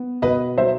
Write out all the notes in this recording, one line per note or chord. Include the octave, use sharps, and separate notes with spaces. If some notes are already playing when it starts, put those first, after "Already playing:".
Already playing: B3
B2 B4 D#5
F#3 C5 E5